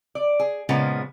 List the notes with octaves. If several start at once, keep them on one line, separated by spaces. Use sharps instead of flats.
D5
G#4
A#2 C#3 F3 G#3 B3